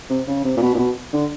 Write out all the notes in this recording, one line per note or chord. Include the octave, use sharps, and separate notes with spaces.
C3
C#3
C3
A#2
B2
A#2
B2
D3